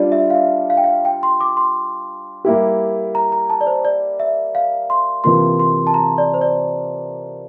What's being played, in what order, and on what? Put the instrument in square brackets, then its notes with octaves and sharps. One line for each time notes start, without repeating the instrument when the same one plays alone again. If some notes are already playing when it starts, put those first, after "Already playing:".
Already playing: [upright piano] G3 D4 F4 [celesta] D5
[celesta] E5
F5
E5
F5
G5
F5
G5
C6
D6
C6
[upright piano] G3 A#3 E4 G4
[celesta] A#5
A#5
A5
D5
C5
D5
E5
F5
C6
[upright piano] C3 E3 A#3 F4 [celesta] C6
[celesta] C6
A5
A#5
D5
C5
D5